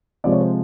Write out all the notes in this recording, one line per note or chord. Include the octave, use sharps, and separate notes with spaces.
C3 F3 G#3 D5
C#5
C5